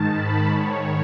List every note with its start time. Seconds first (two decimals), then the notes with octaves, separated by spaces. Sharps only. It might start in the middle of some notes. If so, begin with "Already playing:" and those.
Already playing: G#2 D#3 A5
0.10 B5
0.47 G#2 D#3 C#5